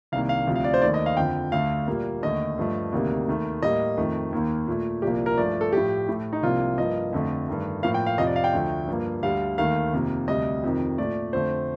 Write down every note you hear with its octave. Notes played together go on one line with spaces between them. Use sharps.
C2 C3 D#3 A#3 F5
F5
D2 C3 F3
F5
D5
C5
D#2 D#3 A3 D5
D#5
F5
F2 D3 F3 G5
D2 D3 A3 F5
A#2 G3 A#3
D#2 D3 A3 D#5
G2 F3 A3
D2 C3 D#3 G3 A#3
D#2 D#3 A3
A2 G3 A#3 D#5
F2 D#3 A3
D#2 D#3 A#3
A#2 A3
C2 A#2 F3 A#3 G4
A#4
G2 F3 A3 D5
A4
A2 F3 A3 G4
A2 A3
D#4
C2 C3 F3 A#3 F4
G2 F3 A#3 D#5
F2 D3 F3 A3
G2 D#3 A3
A2 F3 A#3 F5
G5
F5
F2 C3 F3 D#5
D5
F5
G5
D2 D3 F3 A3
G2 F3 A#3
D2 D3 G3 F5
D#2 D#3 A3 F5
F2 C3 D#3 A#3
D2 C3 G3 D#5
F2 C3 D#3
A#2 A3 D5
F2 D3 A3 C5